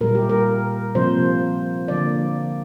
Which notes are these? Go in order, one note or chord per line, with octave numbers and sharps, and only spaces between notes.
A#2 G3 A#3 A#4
G4
A#4
C3 F3 A#3 C5
D3 F3 A#3 D5